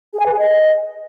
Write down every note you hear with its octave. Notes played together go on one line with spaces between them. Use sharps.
G#4
G#5
B4
G#4
D#5